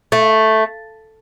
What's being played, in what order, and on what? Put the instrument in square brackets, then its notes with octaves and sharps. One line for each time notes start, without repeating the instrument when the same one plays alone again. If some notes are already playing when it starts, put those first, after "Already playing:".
[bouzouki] A3